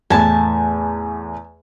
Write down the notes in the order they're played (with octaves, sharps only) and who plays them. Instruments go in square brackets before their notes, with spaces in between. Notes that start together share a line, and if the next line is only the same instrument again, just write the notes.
[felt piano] E2 A2 [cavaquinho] G#5 A5